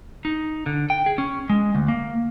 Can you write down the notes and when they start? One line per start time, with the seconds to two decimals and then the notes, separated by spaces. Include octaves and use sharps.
0.25 D#4
0.66 D3
0.90 G5
1.06 G#4
1.18 C#4
1.50 G#3
1.75 D2
1.88 A#3